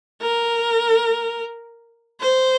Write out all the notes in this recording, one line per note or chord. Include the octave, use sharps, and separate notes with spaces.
A#4
C5